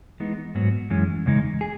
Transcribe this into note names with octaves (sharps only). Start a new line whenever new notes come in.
E3 G#3 B3 D#4
G#2 F#3 B3 F#4
F#2 E3 G#3 C#4
E2 C#3 G#3 D#4
G#4